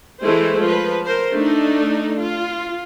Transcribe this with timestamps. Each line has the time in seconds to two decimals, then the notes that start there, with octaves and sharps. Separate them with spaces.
0.23 E3 G#3 A3 C5
0.63 F3 B4
1.04 A#4 C5
1.33 A3 D4 D#4
2.18 F4